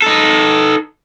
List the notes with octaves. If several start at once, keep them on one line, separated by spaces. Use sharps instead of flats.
D#4 A4